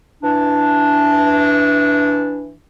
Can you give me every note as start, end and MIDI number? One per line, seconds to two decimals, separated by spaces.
0.22 2.54 52
0.22 2.54 62